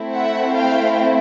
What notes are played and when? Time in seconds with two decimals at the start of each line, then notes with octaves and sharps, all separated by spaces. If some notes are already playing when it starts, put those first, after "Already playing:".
Already playing: A3 C4 E4
0.14 E5 F#5
0.55 F5 G5